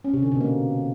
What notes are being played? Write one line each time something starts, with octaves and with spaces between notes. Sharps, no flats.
C#4
C3
D3
B2
A#3